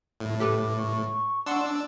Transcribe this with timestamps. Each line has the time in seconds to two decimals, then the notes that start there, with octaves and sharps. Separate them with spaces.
0.20 A2
0.40 G4 A4 B4 D6
0.79 C#6
1.46 D4 F#5 C6 E6 E7